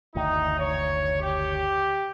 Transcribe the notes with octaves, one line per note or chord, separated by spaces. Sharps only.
F#1 D2 D#3 D#4
C#5
G4